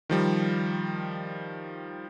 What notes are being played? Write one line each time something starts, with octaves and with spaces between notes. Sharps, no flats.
D#3 F3 G3